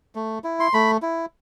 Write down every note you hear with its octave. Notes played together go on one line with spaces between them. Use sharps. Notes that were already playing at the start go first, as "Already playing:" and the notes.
A3
E4
C6
A3 B5
E4